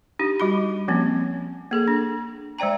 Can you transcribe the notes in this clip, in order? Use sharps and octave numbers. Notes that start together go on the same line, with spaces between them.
D4 D#4 G4
G3 F#4 B5
F3 A#3 C4 C#4
A#3 G#4 A4
D4
G#3 C5 D5 G5 A#5